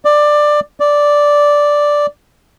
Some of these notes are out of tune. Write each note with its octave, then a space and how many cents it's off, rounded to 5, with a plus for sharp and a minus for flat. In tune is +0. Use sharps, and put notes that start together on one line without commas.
D5 +15
D5 -5